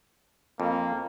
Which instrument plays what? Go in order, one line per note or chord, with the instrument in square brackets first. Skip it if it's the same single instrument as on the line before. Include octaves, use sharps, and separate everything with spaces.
[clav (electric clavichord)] F2 [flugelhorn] A#3